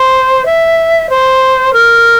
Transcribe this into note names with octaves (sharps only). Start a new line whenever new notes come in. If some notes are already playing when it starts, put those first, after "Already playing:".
Already playing: C5
E5
C5
A#4